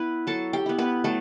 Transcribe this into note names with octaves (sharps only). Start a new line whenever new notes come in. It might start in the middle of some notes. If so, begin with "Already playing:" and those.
Already playing: B3 E4 B4
F#3 A4 A5
G4 G5
B3 E4
B3 B4
F#3 A3 A4